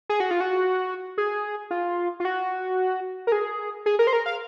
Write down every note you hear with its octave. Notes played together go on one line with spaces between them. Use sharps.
G#4
F#4
F4
F#4
G#4
F4
F4
F#4
A#4
G#4
G#4
A#4
C5
A#4
F5